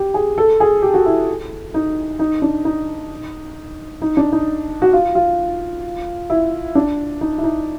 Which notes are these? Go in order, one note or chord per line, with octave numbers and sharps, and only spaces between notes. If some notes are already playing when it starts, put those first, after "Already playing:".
Already playing: G4
G#4
A4
G#4
G4
F#4
E4
D#4
D#4
D4
D#4
D#4
D4
D#4
F#4
F4
F4
E4
D4
D#4
E4
D#4